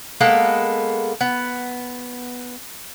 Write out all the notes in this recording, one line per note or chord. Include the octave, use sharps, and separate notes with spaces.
G#3 A#3 B3 A4
B3